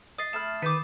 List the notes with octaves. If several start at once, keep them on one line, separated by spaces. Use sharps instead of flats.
D#5 D#6 A6 C7
A3 B5 F6 E7
D#3 B4 D6 D#6 G6 C#7